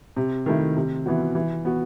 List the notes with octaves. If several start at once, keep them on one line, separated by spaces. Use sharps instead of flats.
C3
D#3 A3 E4
C3
E3 B3 F#4
E3
B3 F#4